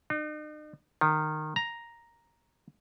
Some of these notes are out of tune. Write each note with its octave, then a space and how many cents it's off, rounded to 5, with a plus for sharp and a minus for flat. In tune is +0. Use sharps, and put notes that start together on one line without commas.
D#4 -45
D#3 -15
A#5 +5